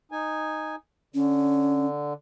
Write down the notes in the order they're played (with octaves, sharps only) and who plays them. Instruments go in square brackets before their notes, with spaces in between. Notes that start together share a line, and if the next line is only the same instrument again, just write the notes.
[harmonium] D#4 G#5
[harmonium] D3 [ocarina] C#4